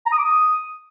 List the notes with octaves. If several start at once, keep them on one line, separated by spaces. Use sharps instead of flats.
A#5
D#6
D6
D#6